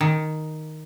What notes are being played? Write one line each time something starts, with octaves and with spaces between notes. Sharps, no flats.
D#3